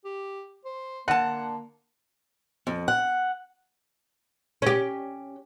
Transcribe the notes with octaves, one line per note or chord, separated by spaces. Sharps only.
G4
C5
D3 A#3 F#5 A5
F2
F#5
C#4 G4